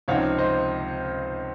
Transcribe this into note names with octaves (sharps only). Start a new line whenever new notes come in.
C#2 C3 F3 C4 D#4 C#5 F5
C5 D#5